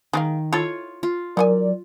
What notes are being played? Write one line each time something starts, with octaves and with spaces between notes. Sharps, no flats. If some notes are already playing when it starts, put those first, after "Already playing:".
D#3 G#3 A#3 F5
E4 F4 A4 C#5
F4
D#3 F#3 G4 A#4 D5 G#5